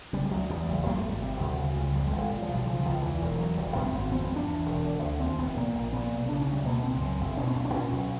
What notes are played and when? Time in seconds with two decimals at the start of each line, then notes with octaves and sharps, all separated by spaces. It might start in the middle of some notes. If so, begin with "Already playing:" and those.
0.13 C#3 G3
0.26 G3
0.31 D2 F#3
0.50 E2 G3
0.68 F#1
0.86 F#2 A#3
0.98 A3
1.04 G#1
1.09 G3
1.22 C3
1.40 D2
1.58 C#3
1.76 C#2
1.95 F2 G3
2.07 G#3
2.12 G1
2.18 G#3
2.31 A#2
2.42 F3
2.49 B1
2.55 G3
2.67 C#3 F3
2.85 C#2 F3
3.03 E2 E3
3.22 E1
3.35 F3
3.39 E2 F#3
3.57 F1 G3
3.76 F#2 B3
3.86 C4
3.94 G#1 B3
4.12 F2 C4
4.24 B3
4.31 G1
4.36 D4
4.48 E2
4.66 E1
4.85 D3
5.02 D2
5.20 D#2 C4
5.39 F1 B3
5.56 A#2 A#3
5.75 A#1
5.93 A#2 B3
6.11 B1
6.29 C#3 D4
6.41 C#4
6.48 D2
6.53 G3
6.66 B2 A#3
6.84 C#2 C4
7.01 F#2
7.20 F#1
7.37 B2 C#4
7.47 C4
7.56 B1 C#4
7.65 D4
7.74 A#2 C#4
7.92 B1